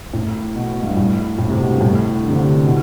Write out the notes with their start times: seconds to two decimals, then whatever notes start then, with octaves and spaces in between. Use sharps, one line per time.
0.13 A2
0.55 B2
0.83 G2
0.97 A2
1.38 A2
1.49 C3
1.60 B2
1.70 G2
1.81 A2
2.23 D3
2.29 C3
2.36 D3
2.64 B2